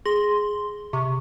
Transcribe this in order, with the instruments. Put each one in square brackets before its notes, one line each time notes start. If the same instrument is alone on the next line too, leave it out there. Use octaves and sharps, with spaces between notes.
[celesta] G#4 A#6 F#7 [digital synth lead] C6
[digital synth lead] C3 [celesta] C#6